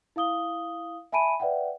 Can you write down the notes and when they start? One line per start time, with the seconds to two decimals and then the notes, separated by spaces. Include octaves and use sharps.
0.16 E4 F5 D#6 G7
1.12 E5 G#5 A5 B5 D7 D#7
1.40 B4 D5 E5 F#5 G5